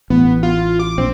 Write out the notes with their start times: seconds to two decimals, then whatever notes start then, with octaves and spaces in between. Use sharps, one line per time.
0.10 A1 B3
0.43 F4
0.80 D6
0.98 A#1 C4